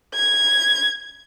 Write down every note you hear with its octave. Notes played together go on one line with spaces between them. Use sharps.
G#6